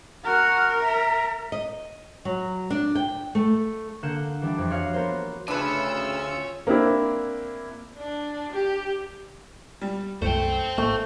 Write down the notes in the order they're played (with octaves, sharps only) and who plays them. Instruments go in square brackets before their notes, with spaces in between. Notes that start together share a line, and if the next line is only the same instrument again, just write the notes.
[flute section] F#4 F6 [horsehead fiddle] A#4
[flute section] E5 A#5
[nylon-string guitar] D#5
F#3
D4
G5
A3
[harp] D3 A#3 F#5 G6 E7
E3 G3 D4
F2
F#4 C#5 F5
B3 A#4 C5
[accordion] D2 C#3 E6 [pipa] D4 B4 [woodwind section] F4 [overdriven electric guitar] C#5 G#5
[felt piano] A#3 C4 D4 E4
[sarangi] D4
G4
[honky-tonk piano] G3
[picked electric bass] C2 F#2 [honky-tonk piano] A3 [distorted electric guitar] C5 G5
[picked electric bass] A1 G#2 A#3 [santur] A3